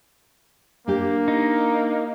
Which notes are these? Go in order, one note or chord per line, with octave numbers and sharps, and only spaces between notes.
A#3 D4 G4
D#4